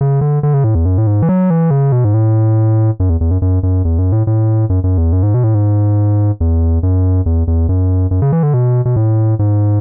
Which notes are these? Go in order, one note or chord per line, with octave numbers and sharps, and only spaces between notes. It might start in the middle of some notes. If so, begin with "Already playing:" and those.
C#3
D3
D3
C#3
A2
E2
F#2
A2
G#2
E3
F#3
E3
C#3
B2
G#2
A2
F#2
E2
E2
F#2
F#2
F#2
E2
F#2
A2
A2
F#2
F#2
E2
F#2
G#2
B2
A2
G#2
E2
F#2
E2
E2
F#2
F#2
C#3
E3
D3
B2
B2
A2
G#2